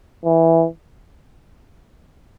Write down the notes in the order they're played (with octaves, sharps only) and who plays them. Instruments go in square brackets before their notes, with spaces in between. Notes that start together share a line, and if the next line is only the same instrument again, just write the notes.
[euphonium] E3